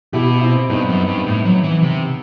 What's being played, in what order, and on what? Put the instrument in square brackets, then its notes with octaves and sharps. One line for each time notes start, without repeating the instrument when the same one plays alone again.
[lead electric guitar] B2 [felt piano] E4 G4
[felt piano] C4 E4
[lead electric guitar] G2 [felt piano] B3 D#4
[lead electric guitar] F#2
G2
A2
F#3
E3
C3